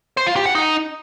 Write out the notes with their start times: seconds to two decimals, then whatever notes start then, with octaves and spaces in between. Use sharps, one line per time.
0.17 C5
0.27 F4
0.36 G4
0.46 F#5
0.55 D#4